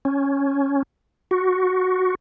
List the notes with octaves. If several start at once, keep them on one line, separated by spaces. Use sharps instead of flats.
C#4
F#4